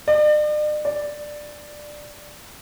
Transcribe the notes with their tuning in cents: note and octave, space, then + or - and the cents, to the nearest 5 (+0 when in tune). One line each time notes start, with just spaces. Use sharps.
D5 +45
D5 +10